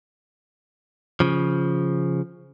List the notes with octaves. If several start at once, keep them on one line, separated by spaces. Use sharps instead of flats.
C#3 F3